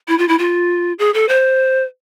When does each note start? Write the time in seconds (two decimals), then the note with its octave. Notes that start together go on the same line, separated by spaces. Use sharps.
0.08 E4
0.18 F4
0.28 E4
0.39 F4
0.99 G#4
1.14 A4
1.29 C5